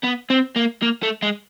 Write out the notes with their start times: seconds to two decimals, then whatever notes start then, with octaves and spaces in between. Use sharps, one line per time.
0.03 B3
0.30 C4
0.56 A#3
0.82 A#3
1.03 A3
1.22 G#3